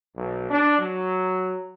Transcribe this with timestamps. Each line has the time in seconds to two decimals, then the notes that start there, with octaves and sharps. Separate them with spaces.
0.16 B1
0.50 D4
0.79 F#3